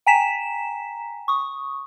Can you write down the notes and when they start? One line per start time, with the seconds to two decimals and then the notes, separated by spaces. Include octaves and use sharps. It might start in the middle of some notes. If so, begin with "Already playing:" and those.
0.06 G5 G#5 A#5 B6 E7
1.28 C#6 D#6